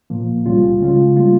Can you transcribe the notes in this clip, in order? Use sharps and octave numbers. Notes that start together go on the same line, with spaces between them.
A#2 F3 A#3
C#2 C3 G3 C#4 F4
C#3 G#3 C#4 F4
G3 A#3 F4